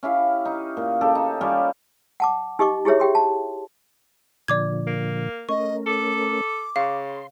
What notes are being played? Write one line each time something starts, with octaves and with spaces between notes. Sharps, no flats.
C#4 E4 G4 F5
D#4
A#2
C#3 G4 A4
D#4
G3 C#4 F4 G4
F#5 A5 D6
D#4 G4 D#5 C#6 D6
E4 G4 G#4 C#5 E5
G4 G5 C6
A5
A#2 D3 F3 D5 D6 G#6
A#3
A3 C#4 A#4 D#5 C#6
A4 D6
C#3 F5 C6